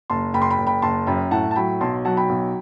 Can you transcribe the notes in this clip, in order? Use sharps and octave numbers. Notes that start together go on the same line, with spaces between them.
F#1 A5 C6
F#1 G5 B5
C6
G5 B5
F#1
G5 B5
F#1 A5 C6
F#2 G5 B5
A2 F#5 A5
A5
F#3 G5 B5
B1 A5 C6
F#3 F#5 A5
G5 B5
B1